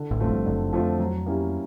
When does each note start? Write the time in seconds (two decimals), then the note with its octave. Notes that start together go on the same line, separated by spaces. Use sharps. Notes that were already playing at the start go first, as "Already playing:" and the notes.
Already playing: D3
0.11 A1 A2
0.20 F#2 F3 A3 C4 F4
0.29 G1 G2
0.46 F#1 F#2 D3
0.73 F2 F3 A3 C4 F4
1.00 F#3
1.26 A#3 C#4 E4 G4